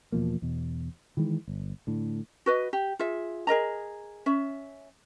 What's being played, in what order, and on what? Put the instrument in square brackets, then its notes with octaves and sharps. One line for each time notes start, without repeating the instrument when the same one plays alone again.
[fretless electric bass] E2 B2 F3 A#3
E2 B2
D#3 E3 G#3
G1
A2 D3
[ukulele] F#4 B4 D#5
G4
F4 G#4 E5
G#4 A#4 D#5 A#5
C#4 E5